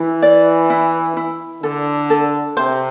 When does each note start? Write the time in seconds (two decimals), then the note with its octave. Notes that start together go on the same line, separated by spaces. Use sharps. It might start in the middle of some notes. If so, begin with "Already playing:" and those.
Already playing: E3 E4
0.22 D5
0.70 E4
1.17 E4
1.63 D3 A4
2.10 A4
2.57 C3 C5